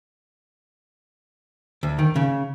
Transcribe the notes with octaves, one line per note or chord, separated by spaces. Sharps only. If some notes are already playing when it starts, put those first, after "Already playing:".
D2
D#3
C#3